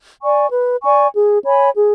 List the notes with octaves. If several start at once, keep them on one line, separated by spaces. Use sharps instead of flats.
D5 G#5 C#6
B4
D5 G#5 C#6
G#4
C#5 G#5 B5
G#4